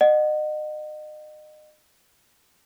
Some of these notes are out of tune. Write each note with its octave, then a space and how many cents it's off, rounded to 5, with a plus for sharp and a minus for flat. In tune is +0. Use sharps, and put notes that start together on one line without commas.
D#5 -30 F#5 +0